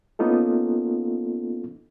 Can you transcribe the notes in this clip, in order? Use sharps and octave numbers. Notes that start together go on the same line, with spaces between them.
A#3 B3 C#4 D#4 F4 A4